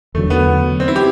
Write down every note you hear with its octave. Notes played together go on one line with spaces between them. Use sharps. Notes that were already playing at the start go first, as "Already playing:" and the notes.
E2 D3 F#3 A3
B3
C4
E4
G4